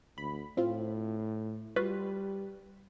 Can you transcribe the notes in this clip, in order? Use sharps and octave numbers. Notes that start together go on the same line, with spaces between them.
D2 B5
A2 C4 F4
G3 F4 F#4 B4